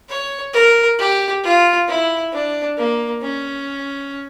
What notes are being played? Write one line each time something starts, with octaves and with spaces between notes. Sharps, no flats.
C#5
A#4
G4
F4
E4
D4
A#3
C#4